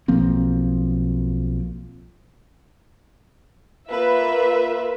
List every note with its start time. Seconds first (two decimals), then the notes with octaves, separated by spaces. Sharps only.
0.08 B1 F3 A#3 C4
3.88 A#3 F4 B4 E5